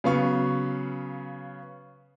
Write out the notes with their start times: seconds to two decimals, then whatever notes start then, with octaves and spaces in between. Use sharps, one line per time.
0.04 C#3 F#3 B3 F5 C#6